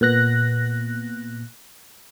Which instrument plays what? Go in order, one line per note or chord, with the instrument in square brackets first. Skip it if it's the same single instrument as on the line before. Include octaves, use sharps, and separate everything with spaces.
[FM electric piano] A#2 B3 F#6 A#6